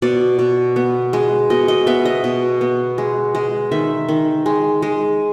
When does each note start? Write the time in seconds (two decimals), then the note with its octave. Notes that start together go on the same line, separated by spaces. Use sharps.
0.02 B2 D5
0.39 B2
0.76 B3
1.13 G#3
1.50 B2 D#5
1.68 D#5
1.87 B3 E5
2.05 D#5
2.24 B2
2.61 B3
2.98 G#3
3.35 G#3
3.72 D#3 E5
4.09 D#3
4.46 G#3
4.82 G#3